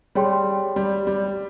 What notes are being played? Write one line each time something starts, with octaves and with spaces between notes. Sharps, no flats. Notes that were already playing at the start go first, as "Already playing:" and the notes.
G3 G#4 C#5 G5 C6
G3
G3